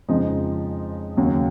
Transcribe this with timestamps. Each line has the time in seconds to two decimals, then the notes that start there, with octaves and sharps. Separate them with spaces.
0.08 F2 C#3 F3 G#3 D#4
1.17 D#2 C#3 F#3